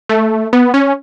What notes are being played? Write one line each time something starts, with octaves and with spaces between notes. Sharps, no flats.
A3
B3
C#4